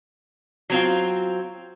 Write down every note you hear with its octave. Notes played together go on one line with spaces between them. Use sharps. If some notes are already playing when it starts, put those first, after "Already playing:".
F#3 C4 F4